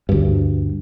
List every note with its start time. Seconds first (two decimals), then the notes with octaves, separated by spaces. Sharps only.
0.09 D2 G2